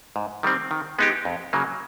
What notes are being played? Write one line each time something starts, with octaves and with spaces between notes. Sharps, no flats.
G#2
D#3 G3 C4
D#3
G#3 B3 D#4 G4
F2
C#3 F#3 A#3